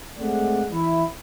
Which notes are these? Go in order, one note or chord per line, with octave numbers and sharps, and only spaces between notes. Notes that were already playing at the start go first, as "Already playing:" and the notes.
G#3 A3 C4 G#4 D5 F#5
E3 E4